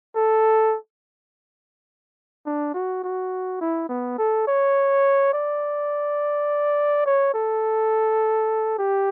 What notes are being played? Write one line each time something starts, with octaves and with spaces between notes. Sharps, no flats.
A4
D4
F#4
F#4
E4
B3
A4
C#5
D5
C#5
A4
G4